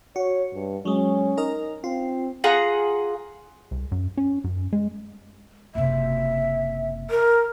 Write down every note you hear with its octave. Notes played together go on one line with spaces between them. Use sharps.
F#4 C#5
G2
F#3 G#3 C#4
D#4 A#4 D#5
C4 F4
F4 G#4 F#5 A#5
C2
F#2
C#4
F#2
G#3
F#1 C3 E5
A#4